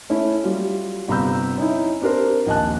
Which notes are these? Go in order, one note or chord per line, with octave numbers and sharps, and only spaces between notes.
A3 C#4 E4
F#3 G3 F4
G1 C3 A#5 B5 E6 G6
C#4 D#4 E4
C4 D4 G4 A#4 C5
A#1 D#2 D#5 G#5 A5 F#6